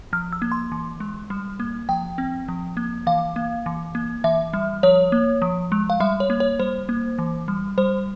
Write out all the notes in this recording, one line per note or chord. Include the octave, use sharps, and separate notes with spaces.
F3 F6
E6
A#3
C6
E3
G#3
G3
A#3
F3 G5
C4
F3
A#3
E3 F5
A#3
E3
A#3
E3 E5
G3
F3 C#5
A#3
F3
G#3
F5
G3 E5
C#5
A#3
C#5
G3 C5
A#3
E3
G3
G3 C5